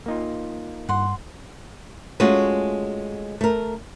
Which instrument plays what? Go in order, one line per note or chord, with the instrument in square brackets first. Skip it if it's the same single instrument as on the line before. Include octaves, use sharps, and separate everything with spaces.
[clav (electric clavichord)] A#3 D#4 F4
[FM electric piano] G2 [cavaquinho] F#5 C6
[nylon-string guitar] G#3 A3 C#4 F4 F#4
A3 A#4